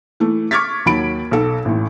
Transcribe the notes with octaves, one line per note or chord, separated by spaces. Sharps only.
E3 A3
C#6 D6 F6 G#6 A6 B6
D#2 F#3 B5 D7
B1 A4
A1 A2